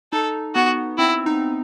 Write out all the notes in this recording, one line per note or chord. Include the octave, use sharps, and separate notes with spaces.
D#4 A4
B3 F#4
C4 E4
D#4